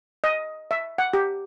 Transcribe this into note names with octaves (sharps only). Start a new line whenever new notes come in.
D#5
E5
F#5
G4